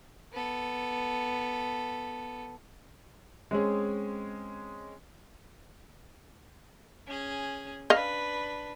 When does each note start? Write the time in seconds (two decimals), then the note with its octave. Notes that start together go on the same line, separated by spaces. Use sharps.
0.33 B3 A4
3.51 G#3 C4 C#4 G#4
7.07 C#4 G#4
7.90 D4 B4 D#5 F5